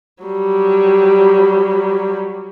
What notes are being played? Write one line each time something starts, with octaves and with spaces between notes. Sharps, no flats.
F#3 G3